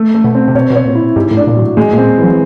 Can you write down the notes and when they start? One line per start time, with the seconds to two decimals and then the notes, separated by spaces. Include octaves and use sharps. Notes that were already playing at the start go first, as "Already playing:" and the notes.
Already playing: A3
0.15 A3
0.24 B2
0.35 C4
0.48 C3
0.55 B2 C#5
0.70 B2
0.75 C#5
0.86 A#2
0.95 E4
1.16 G#2 G4
1.31 A2
1.37 D4
1.47 A#2
1.57 F#3
1.62 A2
1.77 A2 G#3
1.93 A#2 C4
2.18 E3
2.24 F#3